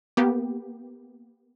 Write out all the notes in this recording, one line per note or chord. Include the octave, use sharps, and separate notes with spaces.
A#3 B3 G4